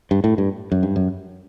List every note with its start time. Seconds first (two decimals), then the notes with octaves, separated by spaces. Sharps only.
0.11 G2
0.24 A2
0.38 G2
0.72 F#2
0.83 G2
0.96 F#2